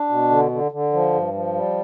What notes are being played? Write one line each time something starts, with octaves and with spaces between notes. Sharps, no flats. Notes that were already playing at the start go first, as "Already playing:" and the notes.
Already playing: D4
B2
D3
D3
D3
F3
G2
F3
G3